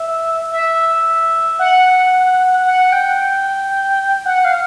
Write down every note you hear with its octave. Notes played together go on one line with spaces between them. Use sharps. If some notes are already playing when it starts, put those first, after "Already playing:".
Already playing: E5
E5
F#5
F#5
G5
F#5
F5